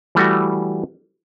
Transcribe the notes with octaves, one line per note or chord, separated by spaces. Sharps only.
E3 G3 A3 F#4